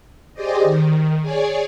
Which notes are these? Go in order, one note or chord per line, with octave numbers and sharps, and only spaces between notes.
G4 G#4 C5 D5 D#5
D#3
G#4 C#5 D5 G#5